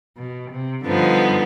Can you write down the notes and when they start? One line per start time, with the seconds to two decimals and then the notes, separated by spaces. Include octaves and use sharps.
0.16 B2
0.50 C3
0.84 G2 D3 F3 B3 D#4